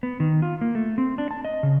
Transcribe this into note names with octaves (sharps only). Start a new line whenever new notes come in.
B3
D#3
F4
A#3
A3
C4
D4
A5
D#5
C#3